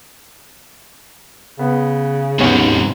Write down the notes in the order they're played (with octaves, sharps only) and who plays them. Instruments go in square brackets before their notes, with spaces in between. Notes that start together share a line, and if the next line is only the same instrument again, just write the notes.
[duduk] C#3 [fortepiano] B3
[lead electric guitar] G#2 C3 [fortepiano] B3 C#4